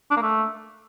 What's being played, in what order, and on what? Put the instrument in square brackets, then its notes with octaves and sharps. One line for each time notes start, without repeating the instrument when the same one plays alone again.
[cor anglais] D4
A#3
A3